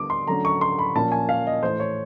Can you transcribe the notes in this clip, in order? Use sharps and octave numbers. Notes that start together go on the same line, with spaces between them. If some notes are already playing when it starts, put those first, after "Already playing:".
Already playing: D3 G3 B3 D6 D#6
C6
D3 F#3 A3 C#4 A#5
C#6
C6
B5
A#2 F3 A#3 C#4 A5
G#5
F5
D#5
A2 E3 A3 C5
C#5